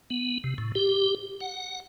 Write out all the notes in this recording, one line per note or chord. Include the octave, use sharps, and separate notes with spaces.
B3
C3
A2
G4
F#5